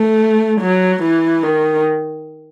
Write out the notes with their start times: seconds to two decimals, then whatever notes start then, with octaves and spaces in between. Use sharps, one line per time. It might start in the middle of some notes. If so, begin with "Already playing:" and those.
Already playing: A3
0.61 F#3
1.03 E3
1.43 D#3